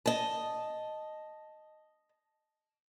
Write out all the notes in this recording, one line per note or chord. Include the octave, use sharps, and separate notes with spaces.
D#5 A5